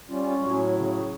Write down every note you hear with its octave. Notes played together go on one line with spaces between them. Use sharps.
G3 C#4 F4
C#4
A2 F#3
C#5
C#3